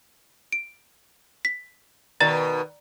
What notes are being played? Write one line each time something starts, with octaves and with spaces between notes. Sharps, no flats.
D7
B6
B2 D#3 D5 A#5 A6